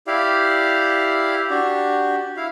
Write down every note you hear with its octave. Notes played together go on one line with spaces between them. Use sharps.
E4 G4 D5 F5
D4 F#4 G4
E4 F5